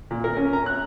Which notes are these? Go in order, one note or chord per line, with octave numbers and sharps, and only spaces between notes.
A#2
A#4
C#4
A#5
F#6